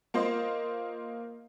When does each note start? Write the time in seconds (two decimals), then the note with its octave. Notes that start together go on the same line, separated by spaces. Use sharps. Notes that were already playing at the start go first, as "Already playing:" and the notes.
0.14 A#3 F4 C5 D#5